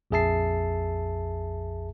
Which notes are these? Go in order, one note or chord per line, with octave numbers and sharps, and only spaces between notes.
A#1 F2 G#4 E5 A5 C7